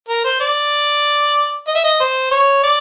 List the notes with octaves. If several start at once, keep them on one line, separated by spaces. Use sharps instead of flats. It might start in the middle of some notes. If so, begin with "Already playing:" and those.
A#4
C5
D5
D#5
E5
D#5
C5
C#5
D5